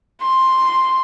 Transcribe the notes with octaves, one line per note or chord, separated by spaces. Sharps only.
C6